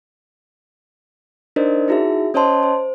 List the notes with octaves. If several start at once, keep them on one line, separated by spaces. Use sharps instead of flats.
D4 D#4 A#4 C5 D5 D#5
D#4 E4 F#4 G#4 E5
C#4 C5 C#5 D#5 A5 C6
C5